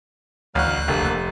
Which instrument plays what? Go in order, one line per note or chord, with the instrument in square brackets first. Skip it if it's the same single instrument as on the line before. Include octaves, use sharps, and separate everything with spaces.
[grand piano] A1 [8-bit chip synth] D2 F#6 [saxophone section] F#3 F5
[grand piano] F1 [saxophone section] D3 A3 A#3